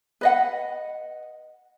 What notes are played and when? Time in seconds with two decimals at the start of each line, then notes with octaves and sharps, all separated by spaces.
0.21 B4 D#5 F#5